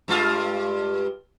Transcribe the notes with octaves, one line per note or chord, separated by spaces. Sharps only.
G2 G#3 F4